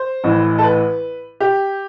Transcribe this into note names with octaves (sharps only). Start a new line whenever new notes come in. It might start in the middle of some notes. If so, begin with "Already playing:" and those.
Already playing: C5
A1 A2 E3
A4
B4
G4